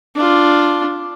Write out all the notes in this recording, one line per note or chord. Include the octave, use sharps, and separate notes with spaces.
D4 F4